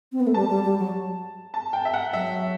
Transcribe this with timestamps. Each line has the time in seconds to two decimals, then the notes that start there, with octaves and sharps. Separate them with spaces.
0.12 C4
0.20 B3
0.27 A3
0.34 G3 A5
0.49 G3
0.64 G3
0.79 F#3
1.54 A5
1.73 G5
1.85 E5
1.93 F#5
2.13 F#3 E5